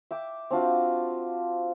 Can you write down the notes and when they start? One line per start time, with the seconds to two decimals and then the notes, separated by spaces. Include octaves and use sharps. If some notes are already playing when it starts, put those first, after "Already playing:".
0.11 E5 G5 D6
0.51 C4 D4 F4 F#4